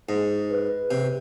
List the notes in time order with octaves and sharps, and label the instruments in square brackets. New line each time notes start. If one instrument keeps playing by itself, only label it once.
[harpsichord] G#2 [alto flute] G#4
[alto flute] B4
[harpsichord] C3